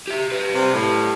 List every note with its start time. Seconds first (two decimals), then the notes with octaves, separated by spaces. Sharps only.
0.07 G4 E5
0.32 G4 B4
0.54 C3
0.74 A2